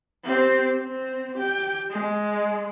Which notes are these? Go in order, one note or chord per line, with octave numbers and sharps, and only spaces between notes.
C4 G4
C4
G4 G5
G#3